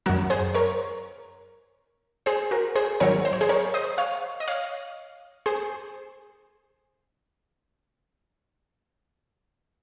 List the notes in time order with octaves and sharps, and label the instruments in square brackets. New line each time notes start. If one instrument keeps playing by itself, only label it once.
[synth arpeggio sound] F#2 D#3 F#3 F#4 A#4
G#4 C5
A#4 C#5
G#4 C5
F#4 A#4
G#4 C5
G#2 D#3 F#3 A#4 C#5
C5
C#5
G#4 C5
A#4 C#5
C5 D#5
C#5 F5
D#5
C#5 F5
G#4 C5